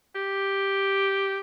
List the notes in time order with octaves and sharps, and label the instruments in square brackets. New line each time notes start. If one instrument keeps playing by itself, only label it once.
[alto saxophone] G4